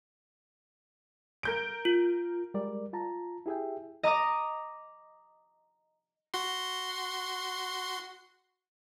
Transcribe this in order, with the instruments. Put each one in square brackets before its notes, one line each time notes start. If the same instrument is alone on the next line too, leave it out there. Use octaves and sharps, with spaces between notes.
[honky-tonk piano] A#4 G6 D7
[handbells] F4
[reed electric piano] G3 G#3 A#4 D5
F4 A5 A#5
E4 G4 G#4 E5 G5
[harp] D#5 A#5 D6 D#6
[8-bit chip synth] F#4 C6